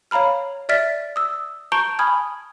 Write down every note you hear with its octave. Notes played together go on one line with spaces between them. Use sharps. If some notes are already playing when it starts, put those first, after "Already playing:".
C#5 F5 A#5 B5 F6
D5 E5 F6 A6 B6
D#6 E6
A5 A#5 C#6 G6 D7 G7
G#5 B5 D#6 F6 G#6